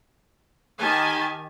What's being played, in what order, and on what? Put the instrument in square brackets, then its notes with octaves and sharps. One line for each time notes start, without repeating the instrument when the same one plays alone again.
[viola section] D#3 G4 G#5 A5